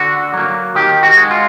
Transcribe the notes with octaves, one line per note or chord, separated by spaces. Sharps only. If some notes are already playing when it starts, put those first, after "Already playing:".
Already playing: D3 F#4
F#3 A#3
D#3 G4
F#4
G#3
F4